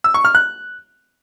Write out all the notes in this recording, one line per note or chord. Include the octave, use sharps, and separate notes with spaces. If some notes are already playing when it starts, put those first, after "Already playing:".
E6
C#6
F6
F#6